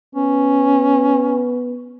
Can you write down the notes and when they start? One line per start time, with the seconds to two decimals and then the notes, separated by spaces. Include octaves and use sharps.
0.15 B3 C#4